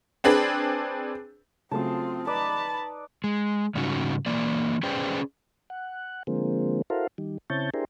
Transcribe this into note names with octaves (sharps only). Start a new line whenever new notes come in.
C4 D4 G#4 B4
C#3 F#3 A3 C4 F4 A5 D#6
D#4 B4 D5 A5 B5
G#3
G#2 C#3 G3 C#4 D#4 F#4
E3 A#3 D5
C#4 G#4 B4 C5 D5 G5
F#5
D3 F3 G#3 A#3 C4
E4 F#4 A4 A#4 C5 F5
D#3 G3
C#3 C4 E4 C#5 A5 G6
D4 E4 G4 G#4 A#4 C5